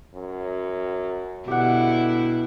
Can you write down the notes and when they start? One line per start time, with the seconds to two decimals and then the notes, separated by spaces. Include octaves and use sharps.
0.14 F#2
1.48 B2 D3 E4 G4 F#5